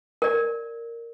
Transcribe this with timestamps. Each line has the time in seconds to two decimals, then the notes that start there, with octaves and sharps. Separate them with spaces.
0.22 A#4 D5